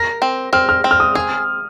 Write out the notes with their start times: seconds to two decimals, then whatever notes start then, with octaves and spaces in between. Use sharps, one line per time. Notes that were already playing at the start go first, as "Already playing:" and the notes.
Already playing: A#4 A#6
0.22 C4
0.53 C4 F6
0.69 F6
0.84 C4
0.91 F6
1.00 D#6
1.15 G#4 D#6